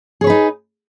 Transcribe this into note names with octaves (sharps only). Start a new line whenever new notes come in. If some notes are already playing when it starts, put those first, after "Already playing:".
D#4 G#4 B4 C#5